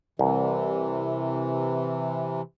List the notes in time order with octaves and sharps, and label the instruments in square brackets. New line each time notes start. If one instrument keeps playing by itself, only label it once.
[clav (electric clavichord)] C2 [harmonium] C3 E3